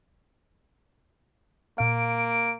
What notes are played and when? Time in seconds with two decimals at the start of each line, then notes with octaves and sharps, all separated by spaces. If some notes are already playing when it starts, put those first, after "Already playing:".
1.78 A#2 A#3 F5 D7